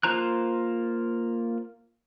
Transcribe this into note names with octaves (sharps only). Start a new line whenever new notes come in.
A#3 F4 C5 A#5 F#6